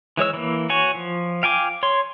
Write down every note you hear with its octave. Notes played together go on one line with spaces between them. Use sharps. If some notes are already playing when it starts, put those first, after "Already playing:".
E3 G#3 C#5 E6
E3 A#3
F#4 C#5 G#5
F3
F5 G5 G#5 D6
C#5 C6